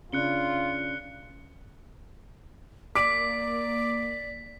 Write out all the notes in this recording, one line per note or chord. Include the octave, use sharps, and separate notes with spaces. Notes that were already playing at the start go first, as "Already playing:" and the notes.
C#3 D4 F4 F#6 C#7 G7
A#3 D5 D6 B6 D7